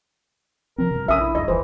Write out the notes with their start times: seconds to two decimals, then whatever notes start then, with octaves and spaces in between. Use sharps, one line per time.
0.78 C3 F3 C4 A#4
0.91 G2 C3
1.08 A#1 C#4 D4 E5 D#6
1.20 E4
1.35 D2 G2 D#5
1.48 F1 D#2 E3 C5